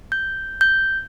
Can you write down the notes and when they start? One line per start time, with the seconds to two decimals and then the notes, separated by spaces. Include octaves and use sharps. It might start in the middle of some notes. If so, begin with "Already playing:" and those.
0.12 G6
0.61 G6